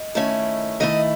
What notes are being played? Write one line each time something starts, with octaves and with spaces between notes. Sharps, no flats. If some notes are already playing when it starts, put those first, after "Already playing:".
Already playing: D#5
D#3 A3 C#4 E4
D#3 A3 E4 D#5